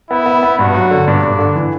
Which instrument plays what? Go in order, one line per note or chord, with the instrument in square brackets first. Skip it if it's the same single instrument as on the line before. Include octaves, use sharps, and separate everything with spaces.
[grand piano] B3 [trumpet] E4
[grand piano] B3
B3
[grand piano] G2 [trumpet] F#4
[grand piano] F#3
D3
[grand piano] G2 [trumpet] D4
[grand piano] G2
D3
E3